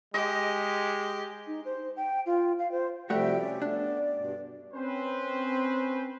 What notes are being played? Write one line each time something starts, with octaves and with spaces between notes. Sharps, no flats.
G#3 G4 D#5
D#4
C5
G5
F4
F5
C5
C3 F3 G3 A3 F#4 G4 E5 G5
C#4 D5
A3 B3 D4
G2 B2
C4 C#4 B4 C5